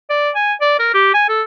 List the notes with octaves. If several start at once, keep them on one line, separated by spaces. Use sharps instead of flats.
D5
G#5
D5
A#4
G4
G#5
A4